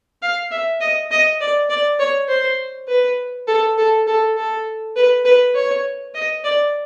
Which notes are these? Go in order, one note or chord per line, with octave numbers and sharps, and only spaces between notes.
F5
E5
D#5
D#5
D5
D5
C#5
C5
B4
A4
A4
A4
A4
B4
B4
C#5
D#5
D5